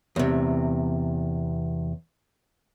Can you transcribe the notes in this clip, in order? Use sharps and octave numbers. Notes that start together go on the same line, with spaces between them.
E2 C3